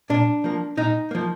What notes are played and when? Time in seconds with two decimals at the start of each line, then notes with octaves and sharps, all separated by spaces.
0.10 A#2 D4
0.44 F3 A#3
0.77 A#2 D#4
1.11 F3 A#3